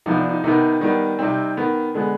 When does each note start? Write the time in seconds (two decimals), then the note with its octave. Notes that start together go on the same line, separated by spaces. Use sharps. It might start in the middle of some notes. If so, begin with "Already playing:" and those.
0.06 C3 F3 B3 D#4
0.17 D4
0.29 D#4
0.44 C3 D#3 B3 D#4
0.81 D#3 G3 B3 D#4
1.19 C3 G3 C4 D#4
1.57 D#3 B3
1.94 D3 G#3 B3